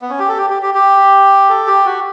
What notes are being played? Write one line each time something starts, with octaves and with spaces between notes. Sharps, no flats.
B3
C#4
G4
A4
G4
G4
G4
G4
A4
G4
F#4